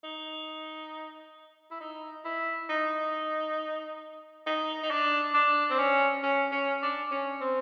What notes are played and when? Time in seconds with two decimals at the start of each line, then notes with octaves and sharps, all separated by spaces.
0.04 D#4
1.71 E4
1.81 D#4
2.25 E4
2.69 D#4
4.46 D#4
4.83 D#4
4.91 D4
5.34 D4
5.70 C4
5.78 C#4
6.23 C#4
6.52 C#4
6.82 D4
7.11 C#4
7.41 C4